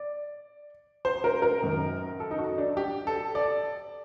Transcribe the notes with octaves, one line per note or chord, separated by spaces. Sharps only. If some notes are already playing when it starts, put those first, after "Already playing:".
Already playing: D5
C5
A#4
A#4
F#2 D#3
A4
D#4
F#4
D4
G4
A4
D5